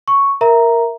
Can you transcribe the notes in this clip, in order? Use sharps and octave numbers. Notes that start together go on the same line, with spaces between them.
C#6
A#4 E5 A#5